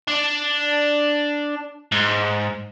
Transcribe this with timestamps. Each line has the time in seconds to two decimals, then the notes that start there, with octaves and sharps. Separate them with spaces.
0.08 D4
1.92 G#2